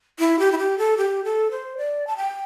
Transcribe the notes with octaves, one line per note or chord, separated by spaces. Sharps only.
E4
G4
E4
G4
A4
G4
A4
C5
D5
A5
G5